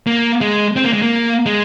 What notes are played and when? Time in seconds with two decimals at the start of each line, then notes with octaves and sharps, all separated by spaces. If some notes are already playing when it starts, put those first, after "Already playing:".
0.07 A#3
0.41 G#3
0.76 C4
0.85 A#3
0.93 G#3
1.02 A#3
1.46 G#3